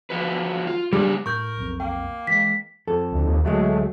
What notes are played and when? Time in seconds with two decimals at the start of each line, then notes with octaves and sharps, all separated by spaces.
0.10 F3 F#4 B4
0.67 F4
0.93 C#3 G3 D4 G4
1.26 A2 A#4 C#6 G6
1.57 B1 F2
1.80 A#3 G5
2.27 E3 G#3 B6
2.87 F2 A4
3.12 D2
3.25 D#2
3.44 D2 F#3 G#3 A3